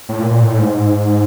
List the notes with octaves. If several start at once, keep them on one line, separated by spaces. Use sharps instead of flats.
A2
A#2
A#2
A2
G#2